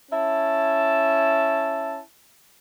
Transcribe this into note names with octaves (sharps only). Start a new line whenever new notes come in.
C#4 E4 A5